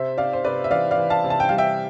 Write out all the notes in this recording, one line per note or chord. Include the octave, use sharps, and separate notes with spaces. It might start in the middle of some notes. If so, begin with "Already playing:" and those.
Already playing: C3 C5 E5
C3 D5 F5
C5
C3 B4 D5
E5
E3 D5 F5
D5 F5
E3
F5 A5
C3
A5
G5
G3 F5
E5 G5